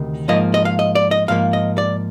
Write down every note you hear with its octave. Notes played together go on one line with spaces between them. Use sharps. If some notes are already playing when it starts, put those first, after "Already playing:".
Already playing: D2 C3 D#3
G#2 F3 A#3 D#5
D#5
F5
D#5
D5
D#5
G#2 F3 A#3 F5
D#5
D5